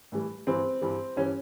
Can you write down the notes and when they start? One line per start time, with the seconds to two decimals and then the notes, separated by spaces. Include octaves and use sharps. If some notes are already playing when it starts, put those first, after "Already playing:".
0.12 A2 E3 G3
0.47 G2 E3 G3 C4
0.81 G2 E3 G3
1.16 G2 E3 G3 C#4